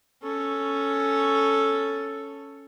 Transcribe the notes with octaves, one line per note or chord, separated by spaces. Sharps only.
C#4 A4